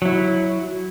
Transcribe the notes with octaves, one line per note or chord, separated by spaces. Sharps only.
F#3 E4